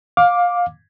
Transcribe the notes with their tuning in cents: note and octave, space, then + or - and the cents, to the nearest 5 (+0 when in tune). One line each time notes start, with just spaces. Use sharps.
F5 +20 D6 +0